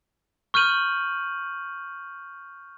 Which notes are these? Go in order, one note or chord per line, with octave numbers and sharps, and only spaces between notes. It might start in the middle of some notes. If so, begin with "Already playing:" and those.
C#6 F6 G6 D#7 F#7